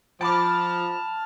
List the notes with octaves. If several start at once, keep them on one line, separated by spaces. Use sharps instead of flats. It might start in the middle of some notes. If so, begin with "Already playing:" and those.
F3 G5 A5 B5 D6 F6